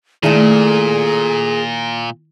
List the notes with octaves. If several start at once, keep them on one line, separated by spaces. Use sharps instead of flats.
A#2 D#3 A3 D4 E4 G#4